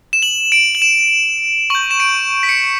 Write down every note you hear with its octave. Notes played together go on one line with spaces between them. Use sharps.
E7
F#7
D7
F#7
E7
C#6 G6 F#7
E7
D7
B6
C#7